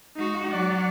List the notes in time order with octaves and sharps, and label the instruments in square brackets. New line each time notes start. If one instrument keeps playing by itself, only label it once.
[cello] G#3 F#4 [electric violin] D#4
[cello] F#3 [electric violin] D5 F#5